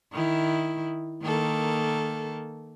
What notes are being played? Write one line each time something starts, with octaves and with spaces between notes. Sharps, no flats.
D#3 E4
D#3 A#3 A4